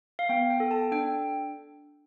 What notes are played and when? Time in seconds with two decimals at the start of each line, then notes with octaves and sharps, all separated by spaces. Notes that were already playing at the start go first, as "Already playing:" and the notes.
0.19 F5
0.29 B3 G5
0.50 G5
0.60 A4
0.71 A5
0.92 D4 G5